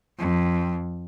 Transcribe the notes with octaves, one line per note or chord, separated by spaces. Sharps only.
F2